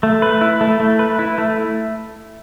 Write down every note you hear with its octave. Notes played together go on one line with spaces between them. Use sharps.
A3
B4
E4
A3
A3
B4
E4
A3